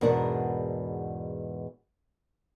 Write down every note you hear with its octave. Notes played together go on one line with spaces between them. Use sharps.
E2 G#2 B2 D4 A#4 F#5